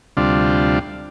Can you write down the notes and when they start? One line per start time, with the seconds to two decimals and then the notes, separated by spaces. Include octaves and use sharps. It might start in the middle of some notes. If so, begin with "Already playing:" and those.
0.17 D2 C3 G3 D4 F4